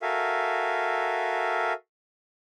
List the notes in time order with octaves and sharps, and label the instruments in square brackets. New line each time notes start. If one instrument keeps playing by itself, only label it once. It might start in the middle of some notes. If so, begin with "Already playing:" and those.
[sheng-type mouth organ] F#4 A4 A#4 E5 F5 G#5